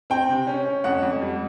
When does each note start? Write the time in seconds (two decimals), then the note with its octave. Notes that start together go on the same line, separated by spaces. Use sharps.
0.10 C4 G5
0.29 C3
0.47 C#4
0.66 C#4
0.84 F2 F#5
1.02 F2
1.22 G3